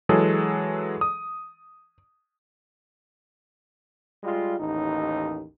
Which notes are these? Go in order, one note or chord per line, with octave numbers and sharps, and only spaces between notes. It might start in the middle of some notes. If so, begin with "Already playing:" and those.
E3 F#3 G#3 G#4 A4
D#6
G3 G#3 F4
A1 D#2 D#4